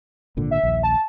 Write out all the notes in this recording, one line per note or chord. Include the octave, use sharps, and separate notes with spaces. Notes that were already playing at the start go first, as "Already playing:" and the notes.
G#1 A#2 D3
E5
A#1 D#2
A5